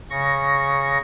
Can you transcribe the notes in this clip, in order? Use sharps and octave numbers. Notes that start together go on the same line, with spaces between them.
C#3 C#6 A#6